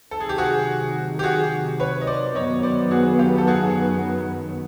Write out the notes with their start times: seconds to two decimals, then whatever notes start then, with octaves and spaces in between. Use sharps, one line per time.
0.11 C3 D#3 F#3 A4
0.20 G#4
0.29 G4
0.38 F#4 G#4
1.19 G4
1.23 F#4 G#4
1.80 B4 C#5
2.01 D#5
2.07 C5 D5
2.35 F#2 D#3 F#3 B3 C#5 D#5
2.63 C5 D5
2.91 F#4 G#4
3.19 F4 G4
3.38 A4
3.47 F#4 G#4